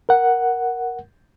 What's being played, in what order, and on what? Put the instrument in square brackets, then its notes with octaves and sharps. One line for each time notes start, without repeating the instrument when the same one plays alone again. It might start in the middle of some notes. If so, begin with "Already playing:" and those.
[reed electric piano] A#4 F#5